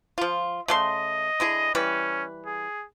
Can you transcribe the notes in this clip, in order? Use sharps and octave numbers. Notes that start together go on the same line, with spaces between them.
F3 F4
C#3 A3 D#5 C6
D3 E4 G#4
E3 G3 C#4 B4
G#4